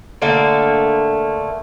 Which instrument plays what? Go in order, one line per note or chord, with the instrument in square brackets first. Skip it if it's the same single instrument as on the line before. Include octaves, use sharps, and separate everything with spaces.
[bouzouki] D3 A3 A#3